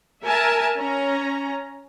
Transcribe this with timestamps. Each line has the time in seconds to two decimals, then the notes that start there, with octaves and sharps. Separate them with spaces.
0.23 A#4 E5 G#5 A5
0.78 C#4 A#5